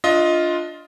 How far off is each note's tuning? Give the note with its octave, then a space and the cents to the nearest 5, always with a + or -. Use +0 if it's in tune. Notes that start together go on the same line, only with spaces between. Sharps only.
D4 +0 F4 +0 D#5 +20